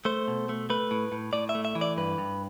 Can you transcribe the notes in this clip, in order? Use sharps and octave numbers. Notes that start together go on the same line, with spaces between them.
A3 C5
B2
A3
A3 B4
A2
A2
A2 D5
E5
A3
E5
E3
D5
G2 B4
G2